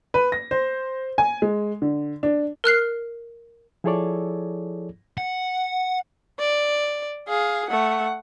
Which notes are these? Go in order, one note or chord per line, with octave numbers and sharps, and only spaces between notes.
B4
A#6
C5
G#5
G#3
D3
D4
A#4 F6 F#6 C7
F3 E4 G#4 A4 C#5 D5
F#5
D5
G#4 F5
A3 F#5